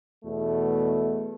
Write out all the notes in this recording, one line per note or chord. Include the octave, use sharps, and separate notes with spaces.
E2 B2 A3